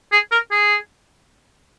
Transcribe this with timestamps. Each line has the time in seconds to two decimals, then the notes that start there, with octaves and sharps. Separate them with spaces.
0.12 G#4
0.32 A#4
0.51 G#4